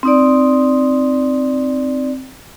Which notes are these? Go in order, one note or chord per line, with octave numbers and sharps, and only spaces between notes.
C4 D#4 D5